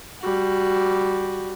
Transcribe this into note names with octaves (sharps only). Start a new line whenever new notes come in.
G3 F#4